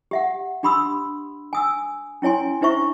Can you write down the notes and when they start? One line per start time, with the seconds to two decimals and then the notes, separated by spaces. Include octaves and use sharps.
0.11 G4 E5 F#5
0.63 D4 G4 B5 C6 D#6 E6
1.53 G#5 D#6 E6
2.22 C#4 E4 C#5 G#5 C6
2.61 D4 E4 C5 E5 C#6